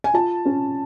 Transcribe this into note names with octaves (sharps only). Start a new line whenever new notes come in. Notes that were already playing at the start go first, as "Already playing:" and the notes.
G#5
F4 A5
C#4